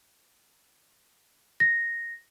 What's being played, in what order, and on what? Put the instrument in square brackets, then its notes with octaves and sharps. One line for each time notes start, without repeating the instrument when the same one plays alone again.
[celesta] A#6